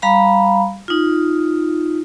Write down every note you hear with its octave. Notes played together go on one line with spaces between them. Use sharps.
G3 F5 A#5 B5
D#4 F4